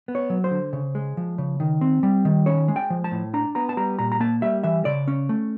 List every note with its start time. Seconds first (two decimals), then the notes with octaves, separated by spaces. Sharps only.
0.08 B3
0.15 C#5
0.30 F#3
0.44 C5
0.51 D3
0.73 C#3
0.95 G#3
1.17 F3
1.38 C#3
1.60 D#3
1.81 C4
2.03 G3
2.25 D#3
2.46 C#4 C#5
2.68 G#3
2.76 G5
2.90 F3
3.04 A5
3.11 A2
3.34 D4 A#5
3.55 B3 A#5
3.69 A5
3.77 G3 A#5
3.99 A#2 A#5
4.12 A#5
4.20 A#3 A5
4.42 G3 E5
4.64 E3 E5
4.85 C#3 D5
5.08 C#4
5.29 A3